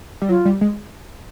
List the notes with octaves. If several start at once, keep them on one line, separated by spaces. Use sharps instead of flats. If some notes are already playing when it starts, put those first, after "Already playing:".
G3
F#3 F4
G3
G#3